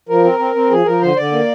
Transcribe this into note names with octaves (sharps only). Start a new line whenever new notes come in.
F3 A#4
C4
C4
C4
F3 G#4
F3 A#4
D3 C5
D3 D5
A#3